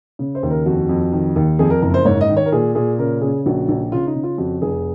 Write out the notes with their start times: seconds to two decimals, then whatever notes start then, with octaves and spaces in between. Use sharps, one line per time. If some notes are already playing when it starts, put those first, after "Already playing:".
0.19 C#3
0.35 C5
0.43 D#2
0.50 A#4
0.66 F2 F#4
0.89 F2
1.12 D#3
1.36 D#2
1.59 F2 G#4
1.70 A#4
1.82 F#1 A#4
1.94 C5
2.05 G#2 C#5
2.21 D#5
2.29 D#3
2.37 C#5
2.46 A#4
2.52 A#2 G#4
2.75 A#2 G#4
2.98 C#3 A#4
3.21 C#3 G#4
3.46 A#1 F#4
3.68 A#1
3.92 C#3 F4
4.07 D#4
4.15 C#3
4.23 F4
4.38 F2 F#4
4.62 F1 G#4